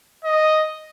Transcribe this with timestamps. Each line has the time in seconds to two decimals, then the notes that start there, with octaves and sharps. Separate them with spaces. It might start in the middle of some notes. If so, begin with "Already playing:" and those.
0.25 D#5